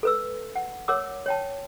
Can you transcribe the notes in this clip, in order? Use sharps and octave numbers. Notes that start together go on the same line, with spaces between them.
A4 B4 E6
F#5
A#4 C#5 F#5 D6 E6
C#5 G5 A5